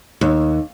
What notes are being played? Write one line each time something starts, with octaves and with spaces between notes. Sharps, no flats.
D#2